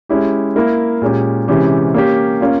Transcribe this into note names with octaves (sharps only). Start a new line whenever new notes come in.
G#3 C#4 E4 G4
A#3 E4 A#4
A#2 G#3 C#4 G4
C3 E3 G#3 C#4 G4
A#3 C#4 G4
A#3 C#4 F4